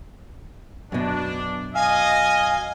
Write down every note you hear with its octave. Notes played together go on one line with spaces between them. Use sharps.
F#2 B2 D4
D#5 F5 G#5